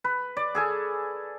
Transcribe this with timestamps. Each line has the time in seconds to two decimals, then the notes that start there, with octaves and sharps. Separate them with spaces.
0.04 B4
0.37 D5
0.55 G#4 A4 G#5